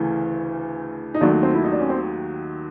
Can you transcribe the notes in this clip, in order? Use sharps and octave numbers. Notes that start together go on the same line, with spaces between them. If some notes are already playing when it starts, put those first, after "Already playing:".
Already playing: D2 C#3 E3 A3
D#4
D#2 D#3 F#3 A3 D4
C4
E4
D#4
D4
C#4
C4